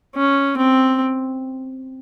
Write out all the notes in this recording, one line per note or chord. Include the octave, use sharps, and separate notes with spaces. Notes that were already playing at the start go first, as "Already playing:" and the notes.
C#4
C4